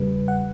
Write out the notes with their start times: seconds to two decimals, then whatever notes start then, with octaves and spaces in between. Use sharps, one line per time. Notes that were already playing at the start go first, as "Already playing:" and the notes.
Already playing: E2 C#3 G3 B4
0.28 F#5